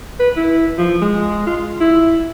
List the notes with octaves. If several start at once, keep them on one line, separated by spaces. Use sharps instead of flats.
B4
E4
F3
G#3
F4
E4